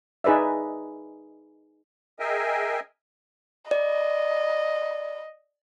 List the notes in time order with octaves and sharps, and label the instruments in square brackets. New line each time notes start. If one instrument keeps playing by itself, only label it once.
[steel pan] D#4 G#4 B4 D5 E5
[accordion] G#4 A#4 D#5 E5 G5 G#5
[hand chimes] D5 [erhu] D#5